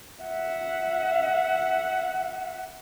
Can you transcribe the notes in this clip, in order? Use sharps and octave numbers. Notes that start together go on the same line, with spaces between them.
E5 F#5